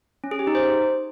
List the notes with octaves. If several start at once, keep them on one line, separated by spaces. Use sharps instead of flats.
C#4
G#4
G4
D#4
C5